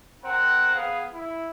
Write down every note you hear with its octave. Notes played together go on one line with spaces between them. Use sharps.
C4 A#4 F#5
B3 G#4 F5
E4